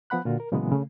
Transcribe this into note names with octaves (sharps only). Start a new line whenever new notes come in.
F3 B3 F#5 B5 F#6
A#2 D3 F4 F#4
A#4
A#2 C#3 E3 F#3 G#3 B3
C#3 A3